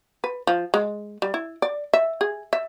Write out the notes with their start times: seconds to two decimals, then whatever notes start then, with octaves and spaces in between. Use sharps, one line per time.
0.24 B4
0.47 F3
0.74 G#3
1.22 G3
1.34 E4
1.62 D5
1.93 E5
2.21 G#4
2.53 E5